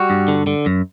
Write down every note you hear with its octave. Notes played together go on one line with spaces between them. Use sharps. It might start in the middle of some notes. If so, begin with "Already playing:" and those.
Already playing: G3 F#4
G2
D3
D3
F#2